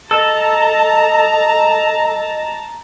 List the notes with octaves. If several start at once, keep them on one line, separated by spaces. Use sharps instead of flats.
A4 D#5 A5 A#5 E6